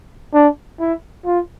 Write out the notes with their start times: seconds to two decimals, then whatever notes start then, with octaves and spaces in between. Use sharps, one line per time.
0.34 D4
0.80 E4
1.26 F4